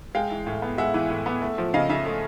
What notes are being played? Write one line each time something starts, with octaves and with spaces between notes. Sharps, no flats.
G#3 F5 G5
E3
A2
B3
G#3 E5 F#5
E3
A2
B3
A3
F3
C#3 D#5 F5
C#3 E5
A3